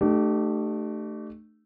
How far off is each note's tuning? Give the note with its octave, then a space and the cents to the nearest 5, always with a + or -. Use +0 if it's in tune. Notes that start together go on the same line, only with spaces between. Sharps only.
A3 +0 D4 +45 G4 -30